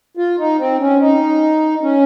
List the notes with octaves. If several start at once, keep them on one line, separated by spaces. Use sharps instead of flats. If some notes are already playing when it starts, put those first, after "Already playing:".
F4
D#4
C4
C#4
D#4
C#4